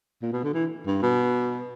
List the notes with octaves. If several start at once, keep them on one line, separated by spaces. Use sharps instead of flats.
A#2
B2
D3
E3
G2
B2